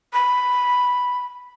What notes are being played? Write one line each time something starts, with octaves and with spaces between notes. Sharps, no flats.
B5